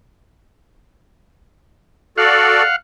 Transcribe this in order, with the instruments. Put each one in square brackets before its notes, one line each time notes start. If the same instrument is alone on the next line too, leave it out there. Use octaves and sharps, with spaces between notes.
[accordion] F#4 A4 D5 [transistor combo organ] F5 F#5